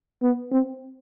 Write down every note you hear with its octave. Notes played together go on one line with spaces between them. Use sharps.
B3
C4